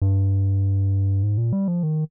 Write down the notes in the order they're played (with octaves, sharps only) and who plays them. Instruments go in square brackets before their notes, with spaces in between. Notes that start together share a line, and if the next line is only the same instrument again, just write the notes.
[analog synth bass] G2
G#2
A#2
G3
F3
D#3